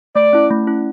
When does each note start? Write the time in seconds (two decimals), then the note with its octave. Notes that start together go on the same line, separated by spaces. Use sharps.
0.15 A3 D5
0.33 C#4 E4
0.51 A3
0.67 C#4 E4